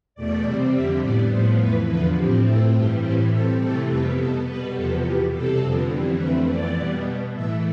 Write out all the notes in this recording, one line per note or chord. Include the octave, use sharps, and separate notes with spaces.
E2 B2 A3 D5
C3 G3 C4
F2 D3 G3 C4 E5
A2 G3 B3 D5
A2 F3 B3 C5
F2 E3 A3 B4
E2 D3 F3 B4
A2 F3 C4 G4
A2 E3 A3 C4 A4
G2 E3 G3 G4
A2 E3 G3 C4 G4
B2 G3 C4 A4
C3 E3 A3 C4 A4
F2 C3 G3 B3 B4
B2 B3 A4
B2 G3 B3 B4
E2 C3 F3 B3 A4
E2 B2 B3 G4
C3 G3 C4 A4
F2 D3 F3 B3
F2 E3 G3 C4
F2 D3 A3 C4 B4
F2 E3 B3 D5
B2 G3 B3
B2 B3
A2 E3 A3 E5